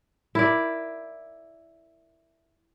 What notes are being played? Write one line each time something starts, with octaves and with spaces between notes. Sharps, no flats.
E4 A#4 D5